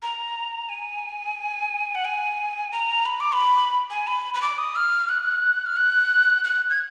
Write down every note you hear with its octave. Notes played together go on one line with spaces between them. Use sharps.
A#5
G#5
F#5
G#5
A#5
B5
D6
B5
G#5
B5
B5
D6
D#6
F6
F#6
F6
F#6
F#6
G#6